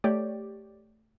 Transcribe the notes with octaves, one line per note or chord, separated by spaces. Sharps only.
A3 G4 C#5 D5